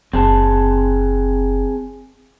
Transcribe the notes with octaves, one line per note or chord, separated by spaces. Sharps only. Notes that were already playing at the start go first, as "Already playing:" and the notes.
F#1 C4 G#4 A5